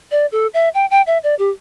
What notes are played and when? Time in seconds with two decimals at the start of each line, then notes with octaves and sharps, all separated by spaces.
0.11 D5
0.32 A4
0.54 E5
0.74 G5
0.90 G5
1.07 E5
1.24 D5
1.39 G4